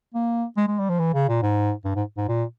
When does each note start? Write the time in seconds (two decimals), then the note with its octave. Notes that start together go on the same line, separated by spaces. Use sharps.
0.14 A#3
0.57 G#3
0.68 G#3
0.79 G3
0.89 F3
0.99 E3
1.14 C#3
1.29 A#2
1.42 G#2
1.85 G2
1.96 G#2
2.17 G#2
2.28 A#2